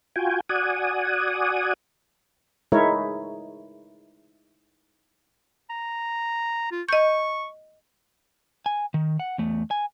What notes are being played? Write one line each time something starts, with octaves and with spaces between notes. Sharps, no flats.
F4 F#4 G5 G#5
F#4 D5 F#5 G#5 D#6
G#3 D#4 E4 A#4 C#5
A#5
F4
D#5 C#6 G6
G#5
D#3
F#5
E2 A3
G#5